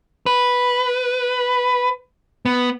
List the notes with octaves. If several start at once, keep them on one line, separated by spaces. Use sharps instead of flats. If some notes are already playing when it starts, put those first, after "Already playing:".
B4
B3